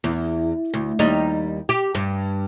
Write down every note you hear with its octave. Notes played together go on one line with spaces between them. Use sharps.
E2
D2
D#2 G3 D#4
G4
G2